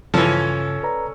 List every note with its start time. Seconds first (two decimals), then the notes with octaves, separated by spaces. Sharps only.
0.14 G2 C#3 E3 F3 C#4 A4
0.83 B4 D5 A#5